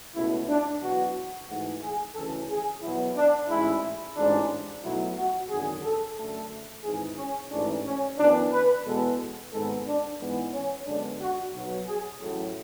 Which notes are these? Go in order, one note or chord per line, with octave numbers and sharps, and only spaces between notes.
C#2 B2 A3 E4
D4
E2 B2 F#3 B3 F#4
G#2 E3 A3 F#4
G#4
D2 C#3 E3 A4
G#4
E2 B2 F#3 B3 E4
D4
A1 G#2 G#3 E4
A1 G#2 G#3 D4
B1 B2 F#3 A3 E4
F#4
G#1 F#2 D3 G#4
A4
F#2 D3 A3 A4
G#1 G#2 E3 G#4
C#4
A1 G#2 E3 A3 D4
C#4
F#2 E3 B3 D4
B4
E2 B2 G#3 B3 A4
G#1 G#2 G#3 B3 A4
D4
G#2 E3 G#3 B3
C#4
F#2 D3 G#3 B3 D4
F#4
B1 B2 F#3 B3
G#4
A1 A2 F#3 A3